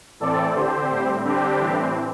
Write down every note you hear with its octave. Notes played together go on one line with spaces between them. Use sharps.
A2 E3 C4 A4 D5
D3 C4 G4 C5
A2 G3 C4
D3 G3 C4 D4 G4
A2 E3 C4